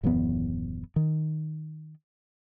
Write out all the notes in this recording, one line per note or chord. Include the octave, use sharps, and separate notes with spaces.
D#1 F#2 E3 B3
D#3